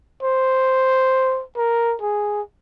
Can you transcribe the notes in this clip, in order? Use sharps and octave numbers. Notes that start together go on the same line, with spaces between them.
C5
A#4
G#4